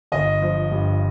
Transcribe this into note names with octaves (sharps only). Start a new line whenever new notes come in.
G1 D#5
F3
G2